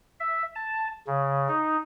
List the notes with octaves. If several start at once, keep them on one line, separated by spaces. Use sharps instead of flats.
E5
A5
C#3
D#4